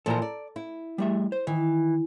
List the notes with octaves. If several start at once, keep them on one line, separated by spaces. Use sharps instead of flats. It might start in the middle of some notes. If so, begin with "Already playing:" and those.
A#2 E3 F3 A4 A5 A#5
D5
E4
G3 A3 E5
C5
D#3 E3